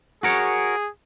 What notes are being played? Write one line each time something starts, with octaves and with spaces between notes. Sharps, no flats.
F#4 G#4 A#4 C#5